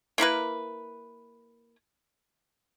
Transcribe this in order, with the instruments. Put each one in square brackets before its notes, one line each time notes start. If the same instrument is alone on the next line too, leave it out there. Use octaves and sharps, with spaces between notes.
[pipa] A#3 E4 A#4 B4